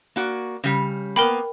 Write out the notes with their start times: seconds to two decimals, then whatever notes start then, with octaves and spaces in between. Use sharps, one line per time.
0.16 A#3 F#4 D5
0.64 C#3 G3
1.16 A#3 B3 A#4 G5 B5